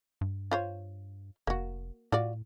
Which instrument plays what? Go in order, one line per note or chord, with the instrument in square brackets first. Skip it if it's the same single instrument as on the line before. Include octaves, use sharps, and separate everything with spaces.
[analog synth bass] G2
[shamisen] F4 C5 C#5
[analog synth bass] F1 [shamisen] A#3 F#4
[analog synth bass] A2 [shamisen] F4 F#4 D5